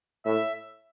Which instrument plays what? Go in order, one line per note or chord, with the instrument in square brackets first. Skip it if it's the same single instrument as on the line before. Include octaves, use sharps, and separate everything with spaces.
[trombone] A2 [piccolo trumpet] E5